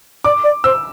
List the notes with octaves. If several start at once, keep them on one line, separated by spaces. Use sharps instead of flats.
D5 D6
D5
C5 E6